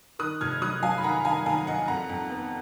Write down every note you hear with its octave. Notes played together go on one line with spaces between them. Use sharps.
D#3 D#6 F#6
F1 F6 G#6
F#3 D#6 F#6
F#3 F5 G#5
B5
D#3 F#5 A#5
D#3 F5 G#5
D#2 F5 G#5
D#2 D#5 F#5
F2 F#5 A#5
F2
B3